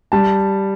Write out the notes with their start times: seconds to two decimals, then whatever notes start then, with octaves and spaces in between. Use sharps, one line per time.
0.12 G3 A5